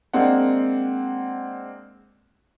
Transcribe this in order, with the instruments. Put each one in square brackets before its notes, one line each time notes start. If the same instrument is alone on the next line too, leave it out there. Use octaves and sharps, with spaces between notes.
[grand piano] G#3 A#3 C4 D4 F#5